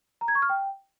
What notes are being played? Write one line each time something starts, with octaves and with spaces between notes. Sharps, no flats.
A#5
G#6
C#6
F6
G5